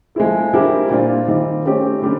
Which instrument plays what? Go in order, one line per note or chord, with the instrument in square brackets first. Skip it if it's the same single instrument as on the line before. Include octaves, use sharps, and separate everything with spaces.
[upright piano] F3 G#3 C4 E4 [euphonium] G#4
[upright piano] G3 C4 E4 G4 A#4 [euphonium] D4
[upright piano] A#2 G3 C4 F4 [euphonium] D4
[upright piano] D#3 G3 C4 [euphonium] D#4
[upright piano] A3 C4 D#4 G4 [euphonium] C#4
[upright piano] D3 G3